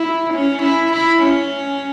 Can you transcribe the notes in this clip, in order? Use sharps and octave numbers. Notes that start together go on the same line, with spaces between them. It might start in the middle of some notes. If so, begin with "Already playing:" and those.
Already playing: E4
C#4
E4
E4
C#4